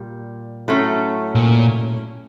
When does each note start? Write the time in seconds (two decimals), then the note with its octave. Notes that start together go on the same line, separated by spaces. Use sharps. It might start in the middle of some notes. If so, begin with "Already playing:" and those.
Already playing: A#2 G3
0.68 A2 F#3 A3 C#4
1.35 A#2